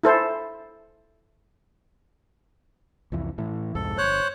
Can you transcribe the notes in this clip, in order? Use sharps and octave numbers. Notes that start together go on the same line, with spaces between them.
E4 A4 C5
C2 F2 E3
A2 E3
C2 F2 G#2 A4
G1 C5 C#5 F#6